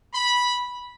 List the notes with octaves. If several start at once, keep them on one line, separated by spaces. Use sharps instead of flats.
B5